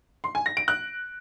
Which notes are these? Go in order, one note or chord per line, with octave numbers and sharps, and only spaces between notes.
C6
G#5
A#6
D7
F#6